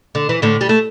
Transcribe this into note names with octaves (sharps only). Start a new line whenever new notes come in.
D3
E3
A2 D3
G3
A3